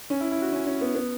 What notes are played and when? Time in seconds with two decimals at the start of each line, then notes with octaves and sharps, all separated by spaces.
0.10 C#4
0.21 E4
0.32 E4
0.42 F#4
0.53 C#4
0.67 C#4
0.81 B3
0.95 B3